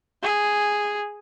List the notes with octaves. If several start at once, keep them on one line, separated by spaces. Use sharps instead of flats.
G#4